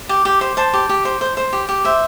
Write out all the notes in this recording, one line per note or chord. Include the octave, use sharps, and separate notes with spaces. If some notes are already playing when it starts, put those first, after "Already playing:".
G4
G4
C5
C5 A5
G4
G4
C5
C5
C5
G4
G4
C5 E5